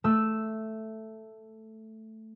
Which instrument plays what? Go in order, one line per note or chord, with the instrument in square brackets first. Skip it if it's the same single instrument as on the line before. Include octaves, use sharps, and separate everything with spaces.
[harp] A3 E6